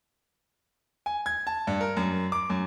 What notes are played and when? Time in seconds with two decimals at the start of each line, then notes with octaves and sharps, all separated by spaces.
1.06 G#5
1.26 G#6
1.47 A5
1.67 G2
1.81 A#4
1.97 F#2
2.32 D6
2.50 F#2